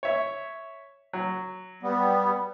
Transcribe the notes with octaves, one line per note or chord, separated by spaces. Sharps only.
C#5 E5
F#3
G3 B3